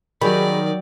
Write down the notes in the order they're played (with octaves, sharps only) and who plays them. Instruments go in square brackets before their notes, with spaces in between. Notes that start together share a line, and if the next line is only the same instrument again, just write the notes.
[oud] D#3 [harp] F#3 G4 [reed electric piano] G#4 B5 [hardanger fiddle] D5